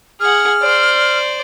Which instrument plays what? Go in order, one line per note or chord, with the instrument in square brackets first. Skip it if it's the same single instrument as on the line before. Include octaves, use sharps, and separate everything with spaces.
[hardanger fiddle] G#4 F#5 [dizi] F6
[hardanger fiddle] C5 D5